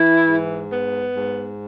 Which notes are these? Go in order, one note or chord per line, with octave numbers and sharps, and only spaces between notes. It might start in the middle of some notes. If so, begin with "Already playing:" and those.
Already playing: E3 E4
G#2
B3
G#2